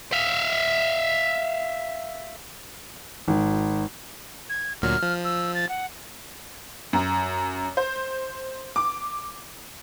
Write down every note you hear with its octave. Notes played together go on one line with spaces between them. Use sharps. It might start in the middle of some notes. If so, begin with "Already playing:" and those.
E5 F5
G#1
G#6
D2 A#2 F#3 F6
F3
E6
A6
F#5
F#2
C5
D6